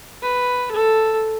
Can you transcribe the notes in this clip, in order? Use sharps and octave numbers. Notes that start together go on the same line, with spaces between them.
B4
A4